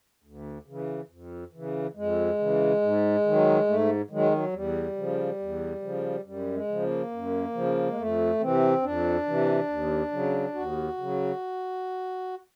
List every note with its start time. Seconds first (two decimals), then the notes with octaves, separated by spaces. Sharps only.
0.24 D2
0.66 C#3 E3
1.10 F2
1.53 C#3 E3
1.96 F2 G#3
2.38 C#3 E3
2.82 G#2
3.25 D#3 F#3
3.67 G#2 A3
4.10 D#3 F#3 G#3
4.32 F#3
4.53 E2 G3
4.96 C#3 F3
5.39 E2
5.82 C#3 F3
6.25 F#2 G3
6.54 G#3
6.68 C#3 F3
6.82 A#3
7.11 F#2
7.54 C#3 F3
7.88 G#3
7.97 F2 A3
8.40 C3 E3 C4
8.83 F2 D4
9.26 C3 E3
9.68 D#2
10.12 C#3 F#3
10.55 D#2 F#4
10.97 C#3 F#3